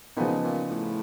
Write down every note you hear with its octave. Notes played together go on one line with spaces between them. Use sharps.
A#2 C#3 F3 G#3 B3 D#4
A#2
A2